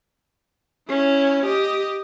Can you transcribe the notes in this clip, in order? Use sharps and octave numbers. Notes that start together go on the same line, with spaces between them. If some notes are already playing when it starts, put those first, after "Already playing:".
C#4 E4
G4 D#5